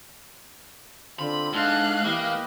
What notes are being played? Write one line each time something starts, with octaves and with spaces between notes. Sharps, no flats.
D3 C4 F4 B5
G#2 D4 A4 F5 F#6
E3 A#3 G4 B4 D#5